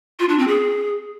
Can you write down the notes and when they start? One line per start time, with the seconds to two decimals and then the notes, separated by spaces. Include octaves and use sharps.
0.19 F4
0.29 D4
0.38 C4
0.48 G#4